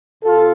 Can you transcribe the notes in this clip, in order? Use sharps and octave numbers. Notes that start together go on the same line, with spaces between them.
C3 F4 A4